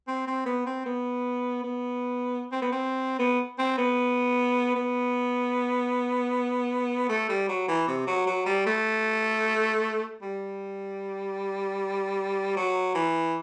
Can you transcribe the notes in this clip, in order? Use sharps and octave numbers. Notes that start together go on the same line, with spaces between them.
C4
C4
B3
C4
B3
B3
C4
B3
C4
B3
C4
B3
B3
A3
G3
F#3
E3
C3
F#3
F#3
G3
A3
G3
F#3
E3